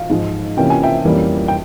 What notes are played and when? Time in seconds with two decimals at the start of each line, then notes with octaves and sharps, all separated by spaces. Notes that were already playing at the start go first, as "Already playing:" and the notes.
Already playing: F5
0.10 G#2 F3 G#3
0.57 C3 E3 A#3 C#4 G5
0.70 G#5
0.83 E5 G5
1.05 F2 E3 G3 A#3 C#4
1.48 G5